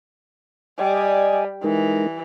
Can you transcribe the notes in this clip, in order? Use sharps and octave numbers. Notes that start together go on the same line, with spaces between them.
G3 D5 D#5 G#5
E3 G#3 D#4 A#4